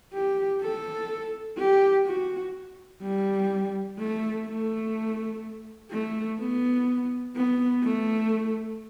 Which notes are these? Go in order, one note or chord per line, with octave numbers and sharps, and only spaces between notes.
G4
A4
G4
F#4
G3
A3
A3
A3
B3
B3
A3